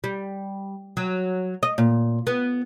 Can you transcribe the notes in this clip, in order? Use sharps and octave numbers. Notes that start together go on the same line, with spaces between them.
G3
F#3
D#5
A#2
B3